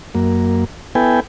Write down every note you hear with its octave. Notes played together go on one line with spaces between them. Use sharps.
F#2 A#3
B3 E4 A4 B4 G5 G#5